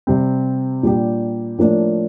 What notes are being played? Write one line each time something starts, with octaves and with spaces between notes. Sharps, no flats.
C3 G3 C4
A#2 G3 D4 G4
A2 F3 A#3 D4